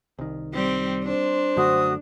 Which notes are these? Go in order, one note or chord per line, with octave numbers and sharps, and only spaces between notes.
C2 D#3
G3 C4
D4 C5
F#2 D3 A3 F#4 D#6